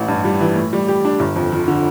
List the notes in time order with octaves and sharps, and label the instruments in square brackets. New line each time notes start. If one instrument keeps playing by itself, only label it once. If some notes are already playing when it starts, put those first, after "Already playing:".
Already playing: [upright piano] A1 E3
G2
G3
E3
A2
G3
G4
D4
G1
F2
F3
D3